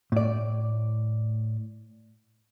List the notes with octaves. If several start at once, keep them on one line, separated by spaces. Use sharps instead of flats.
A2 D5